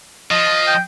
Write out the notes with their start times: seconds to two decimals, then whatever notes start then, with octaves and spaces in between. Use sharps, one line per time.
0.31 F3 D#5
0.67 G5